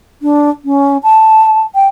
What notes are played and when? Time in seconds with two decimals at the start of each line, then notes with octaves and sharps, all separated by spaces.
0.22 D4
0.65 C#4
1.03 A5
1.75 G5